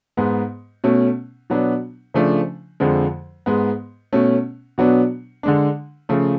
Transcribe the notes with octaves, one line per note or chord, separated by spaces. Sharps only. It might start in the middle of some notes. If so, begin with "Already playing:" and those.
G#2 G#3 B3
B2 A3 C#4
B2 F#3 B3 D4
C#3 F3 A3 D4
F2 D3 F3 G#3
G#2 G#3 B3
B2 A3 C#4
B2 F#3 B3 D4
D3 G#3 D4
C#3 F3 A3